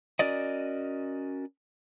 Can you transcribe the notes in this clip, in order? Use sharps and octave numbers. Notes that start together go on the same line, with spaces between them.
C#4 F#4 A#4 D5 D#5